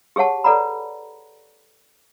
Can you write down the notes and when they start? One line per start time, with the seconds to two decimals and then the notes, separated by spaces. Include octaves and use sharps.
0.16 G4 G#4 C#5 F#5 A5
0.44 A4 B4 D5 F#5 A#5 B5